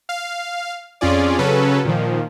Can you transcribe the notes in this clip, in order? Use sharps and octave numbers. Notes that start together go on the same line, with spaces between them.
F5
F2 C#4 F4 G#4 D5
C#3 F#3 C#4 A4 B4
A#2 D#3 F3